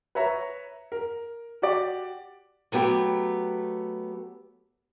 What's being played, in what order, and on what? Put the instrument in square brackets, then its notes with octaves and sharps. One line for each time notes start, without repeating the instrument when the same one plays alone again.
[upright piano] B4 C#5 E5 A#5
A#4
F#4 G4 D5
[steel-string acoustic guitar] F#3 A3 B3 G4